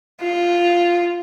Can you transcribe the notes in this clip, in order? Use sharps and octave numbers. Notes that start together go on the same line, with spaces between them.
F4